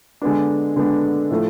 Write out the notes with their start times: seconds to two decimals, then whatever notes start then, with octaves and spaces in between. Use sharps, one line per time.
0.22 D3 G#3 B3 D4
0.76 D3 G#3 B3 D4
1.31 A2 F3 A3